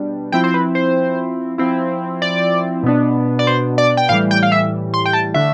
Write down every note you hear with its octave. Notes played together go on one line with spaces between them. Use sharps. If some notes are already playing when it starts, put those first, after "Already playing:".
Already playing: B2 G3 D4
F3 C4 E4 G5
C5
B4
C5
F3 C4 E4
D5
B2 B3 D4
D5
C5
D5
G5
A2 E3 G3 F5
G5
F5
E5
C6
G5
A5
D3 A3 D4 E5